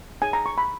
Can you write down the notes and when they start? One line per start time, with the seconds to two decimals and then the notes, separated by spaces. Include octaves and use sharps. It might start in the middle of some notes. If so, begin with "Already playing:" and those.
0.22 D#4 G#4 C#5 G#5
0.33 A#5
0.46 C#6
0.58 B5